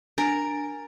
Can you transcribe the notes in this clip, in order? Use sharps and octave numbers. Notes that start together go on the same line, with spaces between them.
D4 A#4 G#5